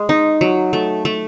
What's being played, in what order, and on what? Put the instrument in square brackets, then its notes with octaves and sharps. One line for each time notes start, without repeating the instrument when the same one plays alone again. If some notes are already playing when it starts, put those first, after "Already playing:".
Already playing: [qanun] G#3
D#4
F#3
A3
A3